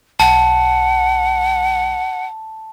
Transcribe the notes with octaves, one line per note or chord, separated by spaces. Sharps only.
B1 F#5 A5